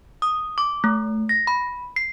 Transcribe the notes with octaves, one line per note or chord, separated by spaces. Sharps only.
D#6
D6
A3
A#6
B5
C7